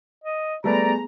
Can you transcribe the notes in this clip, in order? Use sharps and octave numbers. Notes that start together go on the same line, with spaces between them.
D#5
G3 A3 B3 G#4 B4 D5 G#5 A#5